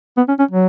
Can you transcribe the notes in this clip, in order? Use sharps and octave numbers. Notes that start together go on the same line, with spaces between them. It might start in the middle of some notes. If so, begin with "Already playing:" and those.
B3
C#4
C#4
F#3